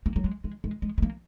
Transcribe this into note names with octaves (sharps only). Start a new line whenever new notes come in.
A#3
F#3
G#3
G#3
G#3
G#3
G#3
A#3